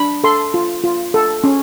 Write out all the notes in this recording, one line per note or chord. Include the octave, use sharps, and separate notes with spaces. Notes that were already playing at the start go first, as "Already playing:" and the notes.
Already playing: D4 B5
A4 C6
F4
F4
A4
C#4